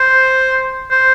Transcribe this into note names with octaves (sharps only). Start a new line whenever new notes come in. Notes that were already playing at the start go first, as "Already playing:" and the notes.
Already playing: C5
C5